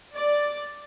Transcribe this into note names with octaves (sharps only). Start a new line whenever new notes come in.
D5